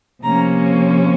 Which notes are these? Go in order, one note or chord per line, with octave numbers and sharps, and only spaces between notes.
C3 F3 A#3 C#4 A#5